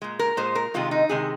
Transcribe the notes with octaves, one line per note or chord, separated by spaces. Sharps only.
A#2 G#3
A#4
A#2 G#3 C5
A#4
C3 D#3 G#3 F4
D#4
C3 D#3 G#3 G#4